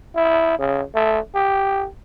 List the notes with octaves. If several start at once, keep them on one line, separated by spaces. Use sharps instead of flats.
E4
C#3
A3
G4